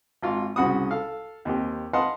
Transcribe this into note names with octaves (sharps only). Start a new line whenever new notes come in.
G#1 F4
C2 C#3 F#4 F#5 B5 D#6
A4 F5
D#2 C4 G4
B4 D#5 F5 F#5 A5 C6